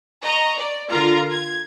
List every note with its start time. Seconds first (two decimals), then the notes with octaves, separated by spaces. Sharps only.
0.23 D#5 A#5 C#6
0.58 D5
0.91 D3 F4 A#4 F5 A#5
1.30 G#6